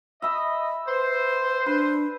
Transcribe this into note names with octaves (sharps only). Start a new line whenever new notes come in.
D#5 E5 B5
B4 C5
D4 B4